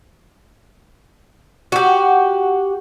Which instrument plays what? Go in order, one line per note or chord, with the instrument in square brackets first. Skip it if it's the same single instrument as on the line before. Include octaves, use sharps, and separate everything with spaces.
[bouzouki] F#4 G4